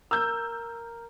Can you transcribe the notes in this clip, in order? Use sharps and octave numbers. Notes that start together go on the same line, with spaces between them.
A#4 A#5 E6 F6 G6